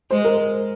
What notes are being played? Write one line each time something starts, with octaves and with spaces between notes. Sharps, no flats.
G#3 C5
A#4